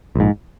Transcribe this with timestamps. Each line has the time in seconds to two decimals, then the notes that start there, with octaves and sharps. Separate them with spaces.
0.15 A#1 G#2